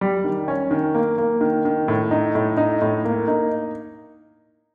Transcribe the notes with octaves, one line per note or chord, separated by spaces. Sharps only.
G3
D#3
C#4
D#3
A#3
A#3
D#3
D#3
A2
D#4
A2
D#4
A2
A#3
D#4